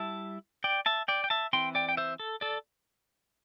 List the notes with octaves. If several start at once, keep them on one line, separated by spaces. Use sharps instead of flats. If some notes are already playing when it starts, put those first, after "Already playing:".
Already playing: G3 E4 E5 A5
D5 G5
E5 A5
D5 G5
G5
E5 A5
E3 C4 E4 G5 C6
D5 G5
G5
C5 E5
A4
A4 D5